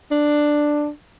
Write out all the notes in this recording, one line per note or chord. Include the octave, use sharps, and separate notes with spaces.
D4